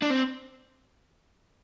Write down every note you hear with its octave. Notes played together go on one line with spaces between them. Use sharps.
D4
C4